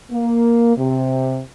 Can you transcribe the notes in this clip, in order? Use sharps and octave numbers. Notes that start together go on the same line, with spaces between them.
A#3
C3